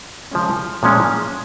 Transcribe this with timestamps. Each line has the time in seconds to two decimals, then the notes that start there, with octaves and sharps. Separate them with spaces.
0.31 C#3 F3 G#3 C#4
0.83 A#2 F3 G#3 C#4